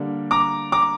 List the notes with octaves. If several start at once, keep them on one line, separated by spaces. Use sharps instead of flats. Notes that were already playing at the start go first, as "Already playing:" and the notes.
Already playing: D3 G3 A#3 D4
A#5 D6
A#5 D6